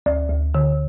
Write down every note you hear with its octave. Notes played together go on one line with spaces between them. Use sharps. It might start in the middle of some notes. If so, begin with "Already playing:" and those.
D2 D5
D2
D3